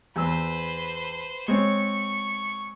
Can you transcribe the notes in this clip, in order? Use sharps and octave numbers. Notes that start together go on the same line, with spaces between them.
E2 B4 C5 E6
G#3 C4 C#5 C#6